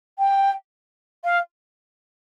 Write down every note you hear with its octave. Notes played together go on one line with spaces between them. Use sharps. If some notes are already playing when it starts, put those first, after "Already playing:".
G5
F5